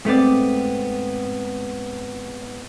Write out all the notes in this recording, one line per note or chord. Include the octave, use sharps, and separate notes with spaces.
G#2 A3 B3 C4 D5